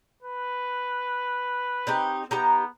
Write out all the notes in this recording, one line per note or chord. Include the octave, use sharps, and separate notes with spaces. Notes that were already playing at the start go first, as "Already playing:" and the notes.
B4
C4 D#4 G4
B3 D#4 G4 A#5